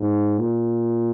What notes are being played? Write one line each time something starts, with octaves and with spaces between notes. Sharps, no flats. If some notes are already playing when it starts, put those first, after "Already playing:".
Already playing: G#2
A#2